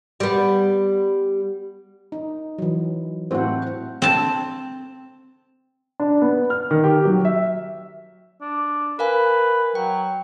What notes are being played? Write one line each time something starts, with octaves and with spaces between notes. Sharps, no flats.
G3 B3
D#4
E3 F#3
A2 C4 F#4 C5 F#5
C4 A5
D4
B3
F6
D#3
G4
F#3
E5
D4
A#4 B4 F5 G#5
F#3 G5